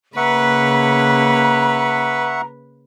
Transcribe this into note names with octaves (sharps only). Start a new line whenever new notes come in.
C#3 A#3 B4 E5 F#5 A#5 C#6